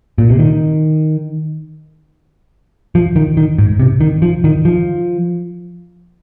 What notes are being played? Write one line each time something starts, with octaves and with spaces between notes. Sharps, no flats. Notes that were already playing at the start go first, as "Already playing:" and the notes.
A#2
C3
D#3
F3
D#3
D#3
G#2
C3
D#3
F3
D#3
F3